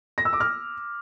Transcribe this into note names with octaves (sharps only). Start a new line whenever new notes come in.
A#6
E6
D6
F6